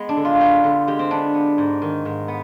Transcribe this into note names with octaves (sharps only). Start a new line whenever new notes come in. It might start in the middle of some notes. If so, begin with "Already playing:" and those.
Already playing: G#3 B3
D4
D3
F4
B3 G4
D3
G#3 G4
C4
B3 D4
B3
G#2
D#3
G#2
B3